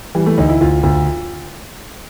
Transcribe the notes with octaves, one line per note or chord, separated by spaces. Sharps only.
E3 G3
A3
D2 D#4
E4
D2 F4
D2 F4